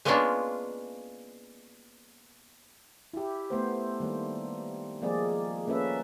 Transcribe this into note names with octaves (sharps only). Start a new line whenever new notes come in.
G#3 A#3 B3 C#4 D4 F4
E4 G4
A3 B3 C5
D#3 G3 A#3
F3 G#3 A#3 C4 G#4 D5
A#3 C#4 A4 B4 E5